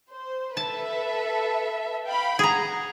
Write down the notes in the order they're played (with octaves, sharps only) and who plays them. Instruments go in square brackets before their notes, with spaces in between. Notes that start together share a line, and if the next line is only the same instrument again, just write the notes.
[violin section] C5
[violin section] A4 B4 E5 [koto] A5
[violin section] F5 G5 B5
[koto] G#4 A#5 [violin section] F#5